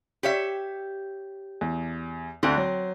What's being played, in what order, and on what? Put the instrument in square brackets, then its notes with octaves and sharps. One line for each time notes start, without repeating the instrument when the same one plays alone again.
[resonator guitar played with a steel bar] G4 C#5 E5
[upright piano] E2
[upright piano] D2 D3 [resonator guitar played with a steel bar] C4
[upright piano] F#3